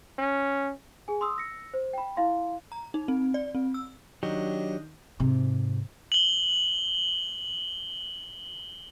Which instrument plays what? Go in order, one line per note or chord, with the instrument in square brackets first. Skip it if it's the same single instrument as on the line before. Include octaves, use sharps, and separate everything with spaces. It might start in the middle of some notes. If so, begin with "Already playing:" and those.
[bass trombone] C#4
[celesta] G#4 G#5
C6 D#6 E6
E6 A#6 C#7
C5
G5 B5
E4 F5 C6
[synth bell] A#5
D#4
C4
D5
C4
E6
[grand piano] D#3 [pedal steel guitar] F#3 [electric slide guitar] D4 G4 [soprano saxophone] D#5
[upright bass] G#2 C3
[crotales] F#7 G7